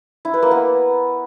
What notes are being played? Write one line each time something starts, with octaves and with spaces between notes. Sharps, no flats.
E4
B4
A#3
B3